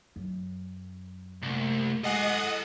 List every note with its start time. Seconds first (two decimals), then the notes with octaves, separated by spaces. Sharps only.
0.16 F#2
1.42 C2 A3 A#3
2.04 G#3 A4 D#5 F#5 G#5 D#6